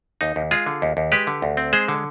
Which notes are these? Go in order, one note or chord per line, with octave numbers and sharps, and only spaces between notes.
D#2 D#4
D#2
G#3 F4 G#4
D3
D#2
D#2
G#3 G4 B4
D3
D2
C4
G#3 G#4 C5
D3